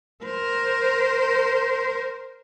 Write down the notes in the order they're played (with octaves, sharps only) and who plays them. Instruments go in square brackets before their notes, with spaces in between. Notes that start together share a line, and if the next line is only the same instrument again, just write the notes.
[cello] A#4 C5